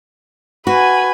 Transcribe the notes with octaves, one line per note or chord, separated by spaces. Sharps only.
F#4 B4 G#5